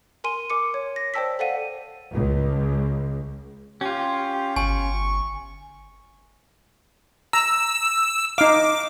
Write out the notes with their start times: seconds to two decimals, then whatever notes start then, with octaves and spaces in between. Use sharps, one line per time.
0.24 A#4 G#5 C6 D#7
0.50 A#4 D6 C#7
0.74 C#5
0.96 A#6
1.14 C5 D5 G5 A5 E6 B6
1.39 A4 C5 D5 F5 F#5 D#7
2.11 C#2
3.81 C#4 F4 G4
4.56 G1 G#5 C#6
7.33 A#5 E6
8.38 D#4 F5 D6